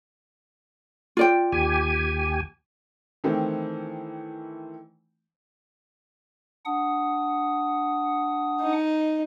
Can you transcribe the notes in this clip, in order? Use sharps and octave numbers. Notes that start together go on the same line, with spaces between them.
F4 D5 G5
D#2 G4 G#5
D#3 E3 A3 C4
D4 F#5 D#6
D#4